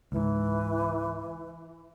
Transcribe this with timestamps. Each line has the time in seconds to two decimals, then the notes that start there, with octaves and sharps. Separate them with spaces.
0.12 C#2 G#2 E3